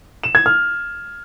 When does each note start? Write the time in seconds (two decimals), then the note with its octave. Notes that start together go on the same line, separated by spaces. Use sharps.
0.23 E7
0.35 G#6
0.46 F6